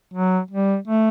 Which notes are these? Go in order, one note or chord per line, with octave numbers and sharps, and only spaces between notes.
F#3
G3
A3